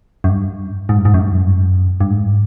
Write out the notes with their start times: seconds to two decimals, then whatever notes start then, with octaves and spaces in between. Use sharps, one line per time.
0.24 F#2
0.29 G2
0.89 G#2
0.98 G2
1.05 G#2
1.14 F#2
1.20 G2
1.31 F2
1.35 F#2
2.01 G2
2.11 G#2